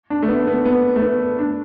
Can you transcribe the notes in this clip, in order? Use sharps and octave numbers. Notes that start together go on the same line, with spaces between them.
D4
A3
B3
B3
B3
A3
B3
D4